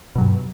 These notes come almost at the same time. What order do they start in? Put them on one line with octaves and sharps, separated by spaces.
B2 F#3 G2